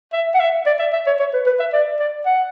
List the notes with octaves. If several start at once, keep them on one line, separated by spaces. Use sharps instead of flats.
E5
F#5
E5
D5
E5
E5
C#5
C#5
B4
B4
E5
D5
D5
F#5